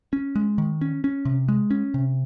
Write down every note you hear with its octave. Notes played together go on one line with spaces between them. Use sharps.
C#4
G#3
D#3
C#4
C#4
C3
G#3
C#4
C3